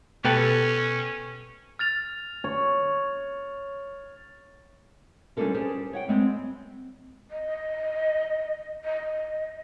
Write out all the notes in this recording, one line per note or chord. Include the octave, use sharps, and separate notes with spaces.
B2 C#4 G4 A4 B4
F6 A6 F7
C#5
G3 C#4 D4 F4 A4 A#4
G4 G#4 C5 A5
C#5 F#5 G5
G3 G#3 C4
D#5
D#5